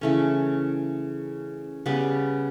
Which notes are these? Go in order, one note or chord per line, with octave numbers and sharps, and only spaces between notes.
C#3 E3 A3 C#4
C#3 G3 B3